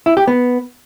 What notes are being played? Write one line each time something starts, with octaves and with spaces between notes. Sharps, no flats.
E4
G4
B3